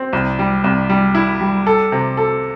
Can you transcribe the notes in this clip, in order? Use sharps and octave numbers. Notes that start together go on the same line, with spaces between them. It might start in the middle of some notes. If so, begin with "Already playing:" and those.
Already playing: C4
C2
G3
C2
G3
E4
G3
A4
C3
A4